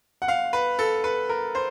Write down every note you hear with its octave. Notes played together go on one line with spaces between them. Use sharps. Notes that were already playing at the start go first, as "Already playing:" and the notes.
F#5
F5
B4
A4
B4
A#4
C5